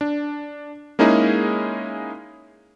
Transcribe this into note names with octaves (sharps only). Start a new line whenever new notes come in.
D4
G#3 A#3 C#4 D#4 E4 G#4